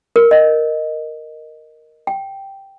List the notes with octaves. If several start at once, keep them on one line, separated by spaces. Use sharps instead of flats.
A#4
D#5
G5